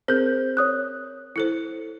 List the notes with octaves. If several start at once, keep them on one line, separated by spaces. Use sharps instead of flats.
C4 G#4 A#4 C5 G6
C#5 D#6 F#6
E4 A4 C5